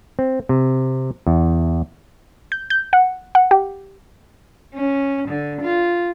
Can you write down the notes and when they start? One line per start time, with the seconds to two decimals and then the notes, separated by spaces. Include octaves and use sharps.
0.19 C4
0.49 C3
1.27 E2
2.52 G6
2.70 G6
2.93 F#5
3.35 F#5
3.51 G4
4.76 C#4
5.28 D3
5.62 F4